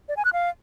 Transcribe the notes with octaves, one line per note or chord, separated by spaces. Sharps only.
D5
G#5
F#6
F5